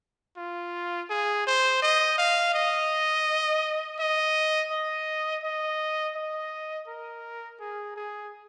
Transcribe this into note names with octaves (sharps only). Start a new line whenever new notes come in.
F4
G#4
C5
D#5
F5
D#5
D#5
D#5
D#5
D#5
A#4
G#4
G#4